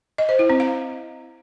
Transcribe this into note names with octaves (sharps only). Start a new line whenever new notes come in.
D#5
C5
E4
C4
F5